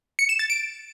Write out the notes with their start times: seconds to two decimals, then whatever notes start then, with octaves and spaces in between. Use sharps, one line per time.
0.19 C#7
0.29 E7
0.39 A6
0.50 D7